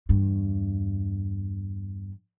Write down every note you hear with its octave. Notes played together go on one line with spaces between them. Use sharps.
E2 G2